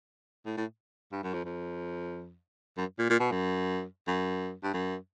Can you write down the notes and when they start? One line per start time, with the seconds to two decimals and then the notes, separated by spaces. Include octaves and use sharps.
0.46 A2
0.57 A2
1.12 G2
1.23 F#2
1.34 F2
1.45 F2
2.77 F#2
2.99 A#2
3.10 A#2
3.20 B2
3.31 F#2
4.07 F#2
4.63 G2
4.73 F#2